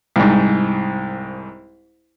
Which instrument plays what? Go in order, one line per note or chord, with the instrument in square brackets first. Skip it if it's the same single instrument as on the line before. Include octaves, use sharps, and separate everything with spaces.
[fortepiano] C2 G#2